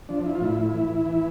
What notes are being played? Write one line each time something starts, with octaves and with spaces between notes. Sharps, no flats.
F3 D4
E4
F4
A2 E4
E3
E3